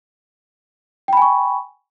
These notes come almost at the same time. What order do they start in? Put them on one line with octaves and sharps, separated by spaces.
G5 B5 G#5 C#6